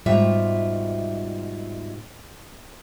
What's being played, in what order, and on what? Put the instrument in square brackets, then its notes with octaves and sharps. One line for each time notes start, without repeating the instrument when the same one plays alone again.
[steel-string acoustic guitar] G#2 B2 G3 F4 E5